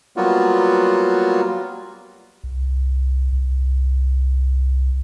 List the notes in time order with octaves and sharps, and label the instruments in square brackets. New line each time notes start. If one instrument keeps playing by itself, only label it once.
[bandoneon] F#3 G3 A#3 B3 F4 F#4
[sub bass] C2
C2